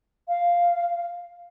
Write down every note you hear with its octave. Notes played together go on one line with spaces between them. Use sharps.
F5